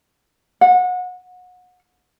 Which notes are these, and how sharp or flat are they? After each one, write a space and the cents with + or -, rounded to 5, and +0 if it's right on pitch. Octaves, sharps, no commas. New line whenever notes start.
F#5 -30